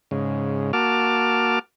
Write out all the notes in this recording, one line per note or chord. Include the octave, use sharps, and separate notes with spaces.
G#2 C#3
A#3 F#4 A5 D6 F6